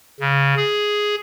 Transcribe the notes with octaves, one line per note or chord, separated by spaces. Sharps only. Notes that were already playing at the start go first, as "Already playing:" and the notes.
C#3
G#4